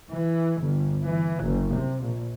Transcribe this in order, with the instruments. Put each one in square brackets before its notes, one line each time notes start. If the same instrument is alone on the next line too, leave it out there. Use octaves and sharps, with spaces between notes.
[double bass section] E3
G1
E3
F#1
C3
A#1